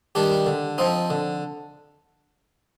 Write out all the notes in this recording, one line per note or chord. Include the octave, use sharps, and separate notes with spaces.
D#3 G3 D4 G4
D3
F3 C4 D#4
D3